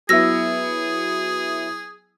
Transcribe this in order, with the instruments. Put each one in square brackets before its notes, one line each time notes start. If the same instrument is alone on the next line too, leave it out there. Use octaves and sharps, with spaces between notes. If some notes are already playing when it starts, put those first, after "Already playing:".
[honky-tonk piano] F#3 B3 E4 [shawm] G#4 [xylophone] E6 A#6